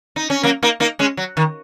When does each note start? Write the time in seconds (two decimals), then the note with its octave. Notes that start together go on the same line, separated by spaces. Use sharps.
0.16 D#4
0.30 C#4
0.43 F#3 A#3
0.63 A#3 D#4
0.80 A#3 D#4
0.99 G#3 C#4
1.17 F#3
1.37 D#3